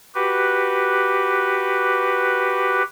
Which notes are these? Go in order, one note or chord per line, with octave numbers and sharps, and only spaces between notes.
F#4 G4 B4